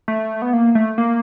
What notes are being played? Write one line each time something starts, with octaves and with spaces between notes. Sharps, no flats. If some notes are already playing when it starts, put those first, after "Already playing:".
A3
B3
A#3
A3
A#3